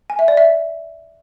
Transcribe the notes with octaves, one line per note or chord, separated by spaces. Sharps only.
G#5
E5
D5
E5